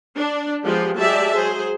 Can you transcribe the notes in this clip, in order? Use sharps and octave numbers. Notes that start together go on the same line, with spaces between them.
D4
F3 G#3 B3 F4 G4
F#3 G#3 G4 D5 E5 A5
F#3 G#4 C5